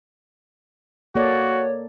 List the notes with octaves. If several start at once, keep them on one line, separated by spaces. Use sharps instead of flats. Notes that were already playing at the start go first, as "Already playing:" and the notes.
A#3 F#4 A4 C#5 D5